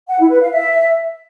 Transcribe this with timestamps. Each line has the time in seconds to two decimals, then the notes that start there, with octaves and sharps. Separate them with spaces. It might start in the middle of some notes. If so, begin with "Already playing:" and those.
0.09 F#5
0.19 E4
0.30 B4
0.41 F5
0.51 E5